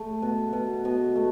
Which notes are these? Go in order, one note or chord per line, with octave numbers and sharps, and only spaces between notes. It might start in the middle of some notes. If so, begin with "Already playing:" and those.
Already playing: A3
B2
B2
B2
A3